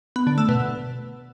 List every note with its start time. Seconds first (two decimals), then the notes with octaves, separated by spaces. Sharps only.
0.16 B3
0.27 D3
0.38 A3
0.49 B2